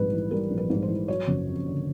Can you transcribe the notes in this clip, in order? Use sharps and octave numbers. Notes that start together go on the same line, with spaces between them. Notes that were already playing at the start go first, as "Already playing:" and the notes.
Already playing: A#1 G#2 G3 B4
E3
G3 A#4
A#1
B4
G#2
C5
E3
F#3 C#5
F#1
F2
D3